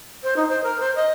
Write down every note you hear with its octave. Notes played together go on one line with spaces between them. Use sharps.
C5
D#4
C5
A#4
C5
D#5